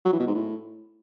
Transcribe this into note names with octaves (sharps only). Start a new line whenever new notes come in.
F#3
E3
B2
G#2
A2